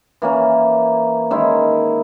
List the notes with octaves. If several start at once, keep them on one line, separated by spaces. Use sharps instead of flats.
E3 A#3 C#4
D#3 G#3 C#4 E4